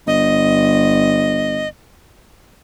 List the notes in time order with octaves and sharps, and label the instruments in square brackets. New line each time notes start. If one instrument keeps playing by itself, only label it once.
[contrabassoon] G1 [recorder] D#5